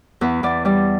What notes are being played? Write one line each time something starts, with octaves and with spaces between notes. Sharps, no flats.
E2 B4
E2 D5
G3 D5